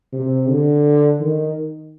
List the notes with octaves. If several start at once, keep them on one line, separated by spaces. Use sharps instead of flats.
C3
D3
D#3